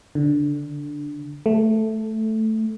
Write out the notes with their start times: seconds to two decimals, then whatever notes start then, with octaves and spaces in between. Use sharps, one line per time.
0.15 D3
1.46 A3